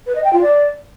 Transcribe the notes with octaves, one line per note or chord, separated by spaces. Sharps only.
B4
D#5
G5
F4
D5